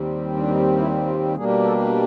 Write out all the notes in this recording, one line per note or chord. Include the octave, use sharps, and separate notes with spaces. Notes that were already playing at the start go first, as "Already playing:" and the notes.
Already playing: D#2 D#3 G3 C4
D4
D#4
E4
F4
B2 G3 A#3 D4 G#4
A4